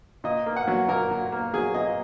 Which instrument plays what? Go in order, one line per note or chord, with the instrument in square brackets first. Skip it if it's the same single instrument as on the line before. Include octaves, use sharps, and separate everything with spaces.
[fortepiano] A#2 D#5
A#3
F#5
F#3
A#2 A#4
A#2
A#3
F#3 G#4
A#2 D#5